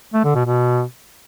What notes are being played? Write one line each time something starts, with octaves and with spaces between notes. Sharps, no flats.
A3
D3
B2
B2